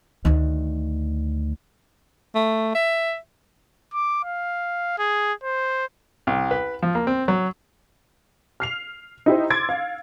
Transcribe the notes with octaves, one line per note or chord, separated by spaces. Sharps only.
D2 D#3
A3
E5
D6
F5
G#4
C5
C2
B4
F3
A#3
C4
F#3
F6 C7 F7
D#4 E4 G4 C5
C6 D6 E6 G#6 A6 D7
F5